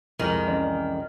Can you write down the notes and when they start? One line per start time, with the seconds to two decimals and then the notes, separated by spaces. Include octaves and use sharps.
0.20 C2 F2 D#3 G#3
0.48 E3 C#4 D5